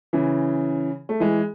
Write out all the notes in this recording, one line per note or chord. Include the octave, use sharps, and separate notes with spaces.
C#3 E3
A3
E3 G#3